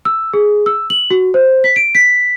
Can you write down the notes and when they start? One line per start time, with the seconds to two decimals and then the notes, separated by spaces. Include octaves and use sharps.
0.05 E6
0.33 G#4
0.66 E6
0.90 F#7
1.11 F#4
1.34 C5
1.64 B6
1.76 D7
1.95 B6